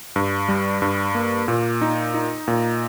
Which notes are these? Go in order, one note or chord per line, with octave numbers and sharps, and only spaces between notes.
G2
G3
G2
A#3
A#2
D#4
D#4
A#2